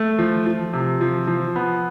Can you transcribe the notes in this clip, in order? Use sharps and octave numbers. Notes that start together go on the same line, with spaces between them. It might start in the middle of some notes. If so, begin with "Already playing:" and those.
Already playing: A3
F3
F3
C3
F3
F3
B3